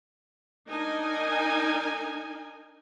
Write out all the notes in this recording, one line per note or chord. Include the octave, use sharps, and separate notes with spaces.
D4 D#4 A#4 D#5 G#5